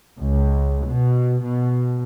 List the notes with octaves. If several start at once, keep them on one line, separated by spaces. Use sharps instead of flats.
C#2
B2
B2